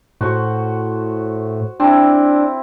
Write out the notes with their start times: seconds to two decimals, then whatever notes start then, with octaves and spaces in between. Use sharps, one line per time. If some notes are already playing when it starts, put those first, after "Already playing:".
0.21 A2 F#4 C5 C#6
1.80 C4 D4 E4